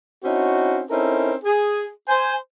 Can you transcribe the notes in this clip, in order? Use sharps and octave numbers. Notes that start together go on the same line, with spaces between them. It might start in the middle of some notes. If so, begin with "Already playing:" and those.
C4 C#4 D#4 E4 F#4
C4 C#4 D#4 E4 A4 A#4
G#4
C5 G#5